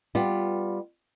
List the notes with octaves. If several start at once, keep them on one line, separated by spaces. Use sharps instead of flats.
G3 B3 F4